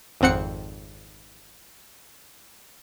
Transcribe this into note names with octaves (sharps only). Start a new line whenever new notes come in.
G#1 F2 C4 F#5 C#7